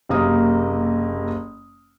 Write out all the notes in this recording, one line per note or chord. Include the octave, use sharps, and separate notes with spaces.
F#1 C3 A#3 D#6